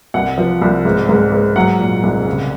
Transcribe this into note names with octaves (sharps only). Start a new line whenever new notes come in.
C2 F#5
F3
C2
G#2
G#2
G#2
F#3 F#5
A#2
C2
C#3